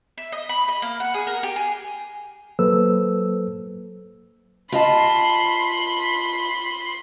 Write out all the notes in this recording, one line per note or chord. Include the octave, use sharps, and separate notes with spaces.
E5
D#5
B5
D#5
A#3
F#5
G#4
A#4
G4
G#4
F#3 A#3 A4 B4 C5 E6
F4 D#5 A5 B5 C6